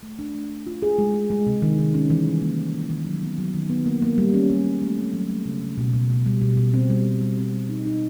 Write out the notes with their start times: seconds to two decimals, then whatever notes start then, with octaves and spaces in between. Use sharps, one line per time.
0.03 A3
0.19 D4
0.35 A3
0.50 D4
0.67 F4
0.82 G#4
0.98 G#3
1.14 G#3
1.30 G#3
1.47 C3
1.62 D#3
1.78 D#3
1.94 C#4
2.10 E3
2.26 G3
2.42 A#3
2.58 A#3
2.74 A#3
2.90 D#3
3.06 F#3
3.22 B3
3.38 F#3
3.54 D#3
3.70 B3
3.86 A#3
4.02 A#3
4.18 G3
4.34 C#4
4.50 G3
4.66 G3
4.82 A3
4.98 C4
5.14 F#3
5.30 A3
5.46 C#3
5.62 C#3
5.78 B2
5.93 B2
6.10 B2
6.26 G3
6.42 B2
6.57 B2
6.74 C4
6.90 G3
7.06 G3
7.21 G3
7.37 C4
7.53 G3
7.69 D#4
7.85 D#4